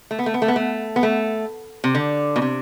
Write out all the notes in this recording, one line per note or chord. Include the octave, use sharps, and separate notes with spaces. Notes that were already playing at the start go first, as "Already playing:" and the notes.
A3
B3
A3
B3
A3
B3
A3
B3
A3
C3
D3
B2
C3